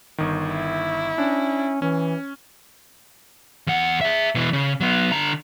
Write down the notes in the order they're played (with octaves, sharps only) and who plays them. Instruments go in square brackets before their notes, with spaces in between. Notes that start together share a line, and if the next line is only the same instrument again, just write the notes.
[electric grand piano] G1 D#3
[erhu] E4
[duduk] C#4 [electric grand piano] D4
[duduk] E3 [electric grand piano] C#4
[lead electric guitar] E2 F#5
G#4 E5
B2 E3
C#3
F#3 B3
D3 A#5